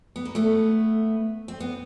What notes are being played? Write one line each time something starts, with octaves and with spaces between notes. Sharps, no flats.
B3
A#3
A3 B3
C4
B3